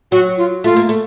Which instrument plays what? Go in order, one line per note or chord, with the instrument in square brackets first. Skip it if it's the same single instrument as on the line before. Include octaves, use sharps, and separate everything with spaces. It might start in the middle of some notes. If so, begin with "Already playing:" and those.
[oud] F#3 [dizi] F#4
[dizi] F4
[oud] A3 [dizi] F4
[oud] A#3
A3